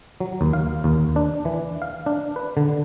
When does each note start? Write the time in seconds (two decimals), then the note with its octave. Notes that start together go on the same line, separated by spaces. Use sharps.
0.20 F#3
0.41 D#2
0.53 F5
0.84 D#2
1.16 D4
1.45 E3
1.82 F5
2.06 D4
2.36 B4
2.57 D3